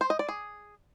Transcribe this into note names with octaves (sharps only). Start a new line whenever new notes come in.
C5
D#5
D5
G#4